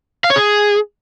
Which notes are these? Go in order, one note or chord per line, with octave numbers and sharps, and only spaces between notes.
F5
C#5
G#4